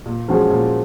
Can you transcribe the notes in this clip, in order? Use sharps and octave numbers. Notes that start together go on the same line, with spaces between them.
A#2
F3 G#3 C#4 F#4
A#2